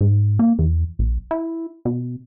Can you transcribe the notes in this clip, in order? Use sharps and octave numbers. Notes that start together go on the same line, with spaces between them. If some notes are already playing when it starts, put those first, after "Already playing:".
G#2
A#3
E2
A#1
E4
B2